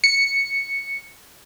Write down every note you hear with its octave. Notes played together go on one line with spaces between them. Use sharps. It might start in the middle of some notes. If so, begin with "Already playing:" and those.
C#7